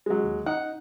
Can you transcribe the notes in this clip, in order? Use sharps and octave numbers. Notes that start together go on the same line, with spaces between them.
F#3 G#3
D#2
D#4 F#5